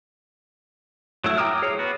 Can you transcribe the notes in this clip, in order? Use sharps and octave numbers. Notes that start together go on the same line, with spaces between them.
F#3 A3 E4
G5 A#5 D6 D#6 F6
G#4 C#5
B3 F#4